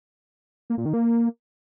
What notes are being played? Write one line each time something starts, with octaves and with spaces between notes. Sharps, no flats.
A#3
A#2
D#3
A#3